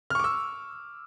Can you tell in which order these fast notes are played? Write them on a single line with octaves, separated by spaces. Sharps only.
F6 C#6 D6 E6